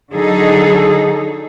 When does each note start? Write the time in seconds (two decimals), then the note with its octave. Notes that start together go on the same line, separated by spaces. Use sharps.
0.12 D3 F#3 D#4 G#4 A4